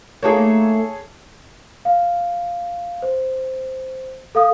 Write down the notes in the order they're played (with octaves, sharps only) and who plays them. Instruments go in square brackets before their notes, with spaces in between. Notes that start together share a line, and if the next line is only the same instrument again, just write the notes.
[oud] A3 A#3 D#4 [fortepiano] G#4 A4 C#5
[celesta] F5
C5
A4 F5 D#6